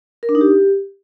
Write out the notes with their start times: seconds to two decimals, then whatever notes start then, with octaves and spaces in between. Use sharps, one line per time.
0.23 A#4
0.29 D4
0.35 D#4
0.41 G4